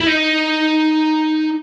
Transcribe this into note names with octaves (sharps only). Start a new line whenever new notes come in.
E4
D#4